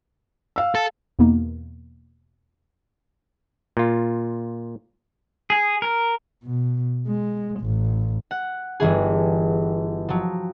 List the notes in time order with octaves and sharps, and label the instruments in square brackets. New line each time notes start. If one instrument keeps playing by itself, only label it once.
[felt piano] F5 E6
[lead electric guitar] A4
[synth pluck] E2 B2 A#3 D#4
[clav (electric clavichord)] A#2 F4
[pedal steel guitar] G#4
A#4
[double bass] B2
G#3
A1
[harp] F#5
G1 E3 G#4
F3 F#3